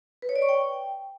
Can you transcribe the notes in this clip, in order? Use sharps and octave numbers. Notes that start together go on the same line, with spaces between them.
B4
C#5
D5
C#6
G5